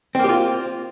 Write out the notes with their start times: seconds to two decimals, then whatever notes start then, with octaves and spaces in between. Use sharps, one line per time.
0.15 C4
0.19 A#3
0.24 G4
0.29 F4